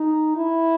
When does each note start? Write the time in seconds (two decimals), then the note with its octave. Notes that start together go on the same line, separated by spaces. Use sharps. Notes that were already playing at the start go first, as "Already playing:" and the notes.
Already playing: D#4
0.36 E4